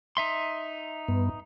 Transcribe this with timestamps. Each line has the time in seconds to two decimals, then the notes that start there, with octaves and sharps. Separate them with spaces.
0.17 D#4 E5 C6
1.08 G2 B3